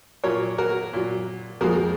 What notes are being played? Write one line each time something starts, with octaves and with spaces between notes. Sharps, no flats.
A#2 F#3 A#4 C#5
F#4 A#4
A#2 F#3
F2 F3 G#3 F#4 A#4